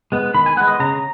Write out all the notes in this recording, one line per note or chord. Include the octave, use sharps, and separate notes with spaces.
G#3 B3
D#3 B5
G#5
G#3 B3 F#5
D#5
C#3 A#5